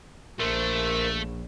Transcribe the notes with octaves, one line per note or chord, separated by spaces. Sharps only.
A#1 A3 A#4 C5